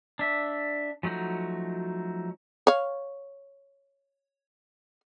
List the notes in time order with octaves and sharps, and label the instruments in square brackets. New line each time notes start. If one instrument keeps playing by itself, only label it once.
[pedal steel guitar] D4 E5
F3 F#3 A3 D#4 F#4
[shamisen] C#5 F5